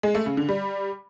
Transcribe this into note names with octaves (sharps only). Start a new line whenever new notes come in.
G#3
A3
C#3
D3
G3